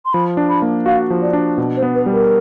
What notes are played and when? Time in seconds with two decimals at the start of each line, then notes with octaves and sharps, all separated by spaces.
0.05 C6
0.13 F3 B5
0.37 D4
0.49 B5
0.62 A#3
0.86 F#4 F5
1.10 F3
1.22 D5
1.33 D4
1.58 B2
1.77 C5
1.82 B3
1.95 B4
2.06 G3
2.12 A#4